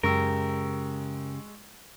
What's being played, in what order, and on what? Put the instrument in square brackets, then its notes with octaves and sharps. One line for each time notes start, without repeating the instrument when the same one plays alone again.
[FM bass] F#2 [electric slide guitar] C#3 G4 [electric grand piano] G#3 C#6 E6 [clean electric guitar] A#4